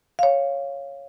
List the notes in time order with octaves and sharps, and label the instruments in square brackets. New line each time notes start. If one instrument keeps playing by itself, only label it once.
[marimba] C#5 F5